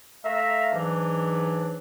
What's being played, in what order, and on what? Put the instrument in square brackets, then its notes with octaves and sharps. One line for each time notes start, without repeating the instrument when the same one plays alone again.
[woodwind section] A3 F5 A#5 [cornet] E5
[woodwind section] G#2 E3 F#3 [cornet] D4